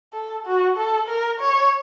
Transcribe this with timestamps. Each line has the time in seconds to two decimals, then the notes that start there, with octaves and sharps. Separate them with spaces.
0.13 A4
0.46 F#4
0.77 A4
1.08 A#4
1.40 C#5